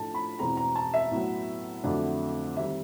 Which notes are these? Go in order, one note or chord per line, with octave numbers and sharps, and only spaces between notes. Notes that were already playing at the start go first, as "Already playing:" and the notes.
Already playing: A2 F3 A3 D4 F4 A5
B5
E2 B2 G#3 C4 A#5
A#5
A5
E5
A2 F#3 B3
F2 D3 F#3 A3 D4
D#3 G3 C4 E5